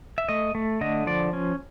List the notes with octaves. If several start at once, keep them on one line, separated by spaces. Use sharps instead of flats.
E5
A3 D#5
A3
D3 D#5
F3 D5
C#4